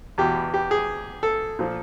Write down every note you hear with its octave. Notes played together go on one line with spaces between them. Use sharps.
E2 B2 G4
G4
G#4
A4
A#2 F3